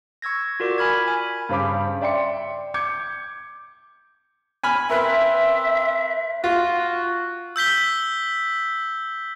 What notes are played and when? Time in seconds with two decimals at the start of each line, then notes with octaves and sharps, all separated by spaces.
0.22 C#6 E6 G#6 A#6
0.60 F4 F#4 A#4 D5 D6
0.78 G#5 B5 F6 G#6
1.08 G#5 B5
1.49 G2 C#3 C5 B5 D6
2.01 D5 E5 G5 C6 C#7
2.74 D6 G6 G#6 C#7
4.63 G#5 B5 F6
4.90 C4 A#4 B4 E5
6.44 F4 F#4
7.56 E6 G6 B6 G7